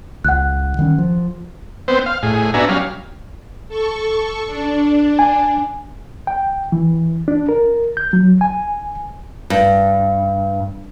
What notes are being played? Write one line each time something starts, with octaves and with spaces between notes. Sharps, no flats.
C#2 F#5 F#6
D#3 G3 C#4
F3
B3 C4 C5
F5
A2 G#4
B3 D4 F#4 E5 G#5 A#5
F#3 G3 C#4 F5
A4 C#6
D4
G#5
G5
E3
D4
A#4
G6
F#3
G#5
G2